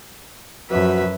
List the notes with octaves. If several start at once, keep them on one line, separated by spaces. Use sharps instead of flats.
F#2 F3 F#4 B4 E5